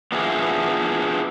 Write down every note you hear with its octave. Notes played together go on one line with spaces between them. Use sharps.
B3 D4 E4 F4 G#4